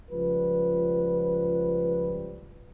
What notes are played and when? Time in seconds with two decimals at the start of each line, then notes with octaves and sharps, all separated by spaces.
0.10 C#2 F3 G3 B4